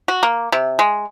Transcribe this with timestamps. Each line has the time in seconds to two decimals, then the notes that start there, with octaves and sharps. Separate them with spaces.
0.08 F#4
0.23 A#3
0.52 C3
0.79 G#3